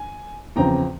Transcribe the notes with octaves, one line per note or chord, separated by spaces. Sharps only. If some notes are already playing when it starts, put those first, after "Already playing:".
Already playing: G#5
E2 C#3 F3 C4 G5 A#5